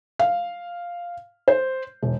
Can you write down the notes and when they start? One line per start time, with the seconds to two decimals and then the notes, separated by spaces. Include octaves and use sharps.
0.19 F5
1.48 C5
2.02 E1